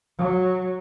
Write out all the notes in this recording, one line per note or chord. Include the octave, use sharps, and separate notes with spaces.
F#3